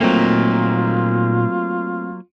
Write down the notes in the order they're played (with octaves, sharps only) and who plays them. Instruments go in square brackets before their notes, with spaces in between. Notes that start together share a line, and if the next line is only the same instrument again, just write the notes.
[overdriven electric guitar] A#2 D#4 [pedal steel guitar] F#3 A#3 [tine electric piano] A3 C4 [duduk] F4